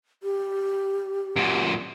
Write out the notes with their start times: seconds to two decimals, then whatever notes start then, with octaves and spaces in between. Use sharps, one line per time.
0.23 G4
1.36 F#2 A#2